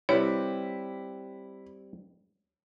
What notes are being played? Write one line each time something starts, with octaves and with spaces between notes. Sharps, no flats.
G3 C4 E4 G4 B4 C#5